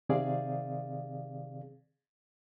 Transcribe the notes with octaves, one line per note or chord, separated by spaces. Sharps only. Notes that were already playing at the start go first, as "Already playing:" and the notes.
C3 D#3 C4 G#4 D5 F5